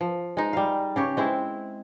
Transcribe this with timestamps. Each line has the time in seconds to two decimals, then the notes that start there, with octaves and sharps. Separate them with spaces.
0.01 F3
0.37 G#3 D#4
0.53 G3 F5
0.96 C#3 G4 C#5
1.17 G#3 C4 E4